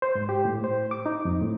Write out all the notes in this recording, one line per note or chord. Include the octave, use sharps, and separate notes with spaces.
C5
G#2
G4
A2
C5
D6
D#4
F2
A2